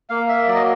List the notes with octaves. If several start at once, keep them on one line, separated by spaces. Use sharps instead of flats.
A#3 F5
E5
F#3 D5
D#5